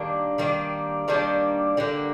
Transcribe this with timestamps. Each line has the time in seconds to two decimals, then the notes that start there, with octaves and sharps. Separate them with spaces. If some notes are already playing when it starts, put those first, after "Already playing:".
Already playing: D#3 G3 A#3 D4
0.38 D#3 G3 A#3 D4
1.08 D#3 G3 A#3 D4
1.77 D3 G3 A#3